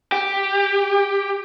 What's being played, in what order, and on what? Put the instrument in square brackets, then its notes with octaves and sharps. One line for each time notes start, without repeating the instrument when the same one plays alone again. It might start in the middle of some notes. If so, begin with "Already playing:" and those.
[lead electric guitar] G4